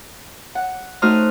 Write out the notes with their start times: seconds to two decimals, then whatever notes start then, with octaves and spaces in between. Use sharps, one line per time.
0.55 F#5
1.02 A3 D#4 F#4 C5 D#6 F6